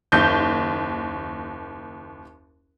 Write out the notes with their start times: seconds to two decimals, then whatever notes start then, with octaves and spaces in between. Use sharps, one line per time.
0.12 F#1 D#2 G6